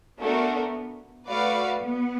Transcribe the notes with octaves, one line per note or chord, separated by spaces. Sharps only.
A3 B3 D4 F#4 A#4
A3 F#4 B4 D5 F5
B3